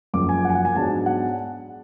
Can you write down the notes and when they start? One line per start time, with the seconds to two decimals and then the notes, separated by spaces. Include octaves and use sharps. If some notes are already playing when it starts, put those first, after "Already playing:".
0.14 F#1 F#2 F3 D6
0.29 G#5
0.45 F#5
0.50 G#5
0.55 F#5
0.65 G#5
0.76 G#2 F#3 B3 D4 A5
1.06 F#5